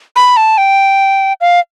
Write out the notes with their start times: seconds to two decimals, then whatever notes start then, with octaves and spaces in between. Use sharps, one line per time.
0.16 B5
0.37 A5
0.58 G5
1.41 F5